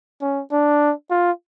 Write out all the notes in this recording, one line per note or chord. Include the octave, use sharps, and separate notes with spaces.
C#4
D4
F4